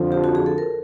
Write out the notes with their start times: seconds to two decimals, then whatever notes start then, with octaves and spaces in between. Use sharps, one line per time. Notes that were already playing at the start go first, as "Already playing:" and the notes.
Already playing: F2 D3 F3
0.12 G4
0.24 F#4
0.35 G#4
0.46 A4
0.58 A#4